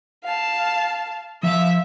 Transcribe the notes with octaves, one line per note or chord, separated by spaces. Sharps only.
F5 A5
F3 E5 F5